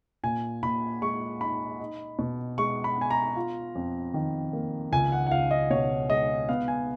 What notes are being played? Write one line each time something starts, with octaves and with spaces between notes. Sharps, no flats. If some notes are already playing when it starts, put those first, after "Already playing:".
A#2 G#5
A#2 B5
G#3 C#6
D#4 B5
D#4
B2
G#3 C#6
B5
B3 G#5
A#5
F4
F2
D#3
A#3
C#2 G#5
F#5
F#5
C#2 F5
D#5
B2 C#5
G#3 D#5
B3 F5
G#5